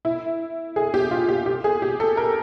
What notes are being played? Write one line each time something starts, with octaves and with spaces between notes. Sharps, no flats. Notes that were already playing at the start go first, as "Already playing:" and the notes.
E4
G#4
G4
F4
G4
G4
G#4
G4
A4
A#4